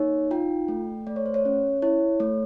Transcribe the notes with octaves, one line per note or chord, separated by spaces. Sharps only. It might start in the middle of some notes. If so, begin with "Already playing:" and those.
Already playing: A#3 D#4 C#5
F4 G5
A3
A3 D5
C#5
C5
C#5
C#4
E4 C#5
A3